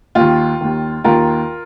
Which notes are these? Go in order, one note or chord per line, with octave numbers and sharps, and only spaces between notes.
D#2 D#3 F4
D#2 D#3
D#2 D#3 F4 A#4